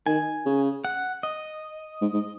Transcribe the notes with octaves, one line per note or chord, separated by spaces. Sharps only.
D#3 G#5
C#3
F#5
D#5
G#2
G#2